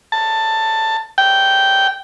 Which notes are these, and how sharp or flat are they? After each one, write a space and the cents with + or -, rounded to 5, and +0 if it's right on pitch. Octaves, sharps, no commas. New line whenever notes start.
A5 +10
G5 -10